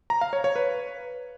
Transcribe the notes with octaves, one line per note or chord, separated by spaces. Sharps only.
A#5
F5
C#5
C#5
B4